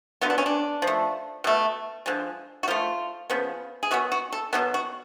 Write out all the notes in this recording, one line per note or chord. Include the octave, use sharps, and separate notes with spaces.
D3 F#3 B3 F4
D4
C#4
D4
F3
A3
B2 A3
D3 F3 G#3
F#4
F3 A3 F4
C#3 F3 B3
G#4
B2 F#3 B3 F#4
F#4
A4
B2 F#3 B3 A4
F#4